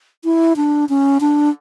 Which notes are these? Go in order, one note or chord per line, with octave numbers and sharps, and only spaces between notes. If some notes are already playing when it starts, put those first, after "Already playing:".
E4
D4
C#4
D4